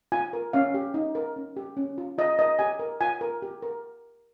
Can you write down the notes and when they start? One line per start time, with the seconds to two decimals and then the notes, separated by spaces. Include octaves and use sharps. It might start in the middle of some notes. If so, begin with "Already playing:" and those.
0.12 F4 G#5
0.33 A#4
0.53 C#4 F5
0.74 G4
0.94 D#4
1.15 A#4
1.36 C#4
1.57 G4
1.77 C#4
1.98 F4
2.18 F4 D#5
2.39 A#4 D#5
2.59 G4 G#5
2.79 A#4
3.01 F4 G#5
3.21 A#4
3.42 G4
3.62 A#4